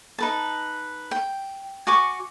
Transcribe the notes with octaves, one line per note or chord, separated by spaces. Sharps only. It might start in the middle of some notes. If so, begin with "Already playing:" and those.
D#4 B4 A5
G5
F#4 G#5 C#6 D6